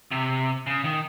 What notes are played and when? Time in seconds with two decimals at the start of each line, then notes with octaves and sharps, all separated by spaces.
0.11 C3
0.67 C#3
0.84 D#3